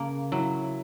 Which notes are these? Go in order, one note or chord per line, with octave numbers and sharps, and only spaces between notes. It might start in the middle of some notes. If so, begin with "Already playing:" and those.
Already playing: C#3 A#3
F#3 E4